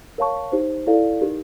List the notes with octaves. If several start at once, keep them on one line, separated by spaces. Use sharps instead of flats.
A#4 C#5 F5 A5 C#6
D#4 G4 C5
E4 A4 D5 F5
D#4 G4 A#4